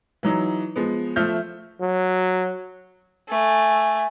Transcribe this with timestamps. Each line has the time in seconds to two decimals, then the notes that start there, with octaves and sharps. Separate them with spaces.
0.23 E3 F#3 D#4
0.76 F3 G#3 B3
1.16 F3 A3 E5 F6 G6
1.81 F#3
3.29 A3 G#5